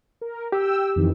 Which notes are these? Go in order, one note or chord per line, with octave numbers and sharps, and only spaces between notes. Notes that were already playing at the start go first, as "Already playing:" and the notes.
A#4
G4 G5 E6
F2 D#3 E3